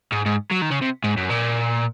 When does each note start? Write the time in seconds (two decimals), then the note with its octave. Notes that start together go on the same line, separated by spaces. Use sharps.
0.12 G#2
0.26 G#2
0.51 F#3
0.61 D#3
0.70 C#3
0.81 C3
1.04 G#2
1.17 F#2
1.30 A#2